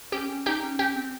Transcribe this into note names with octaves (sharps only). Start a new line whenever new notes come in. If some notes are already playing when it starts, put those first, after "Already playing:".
C#4 G4 G5
C#4
D#4 G4 G5
C#4
C#4 G4 G5
C4